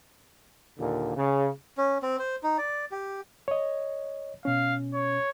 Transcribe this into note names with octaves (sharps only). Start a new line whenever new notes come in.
D#2 A#2 D3
C#3
C#4
C4
C5
D#4
D5
G4
C#5 D#5
B2 C#4 F5
C#5